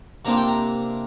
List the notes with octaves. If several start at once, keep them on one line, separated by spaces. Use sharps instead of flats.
C3 A#3 D4 F4 A#5
G5
A#5